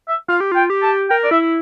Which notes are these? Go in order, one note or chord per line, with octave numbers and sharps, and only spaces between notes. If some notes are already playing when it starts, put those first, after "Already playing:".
E5
F4 F5
G4
F4 G5
G4
A5
A#4 G5
D5
E4 E5
E4